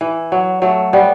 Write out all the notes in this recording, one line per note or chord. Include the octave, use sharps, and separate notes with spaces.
E3
F#3
F#3 A3
G3 B3